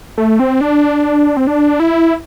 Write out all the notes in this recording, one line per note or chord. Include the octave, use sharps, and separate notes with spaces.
A3
C4
D4
C4
D4
E4